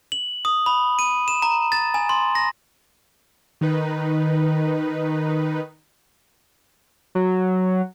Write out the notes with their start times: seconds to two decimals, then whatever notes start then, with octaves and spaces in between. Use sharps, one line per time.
0.12 F#7
0.45 D#6
0.66 B5
0.99 D#7
1.28 E7
1.42 A#5
1.72 A6
1.94 G#5
2.09 C6
2.35 A#6
3.61 D#3 D#4 B4
7.15 F#3